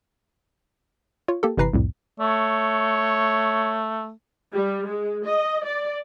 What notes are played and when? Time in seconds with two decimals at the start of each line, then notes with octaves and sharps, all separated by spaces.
1.28 F4 C#5
1.43 A#3 G4 A4
1.57 G1 C3 E3 B4 A#5 C7
1.73 C2 F2 A2
2.20 A3 C#5
4.53 G3
4.86 G#3
5.25 D#5
5.65 D5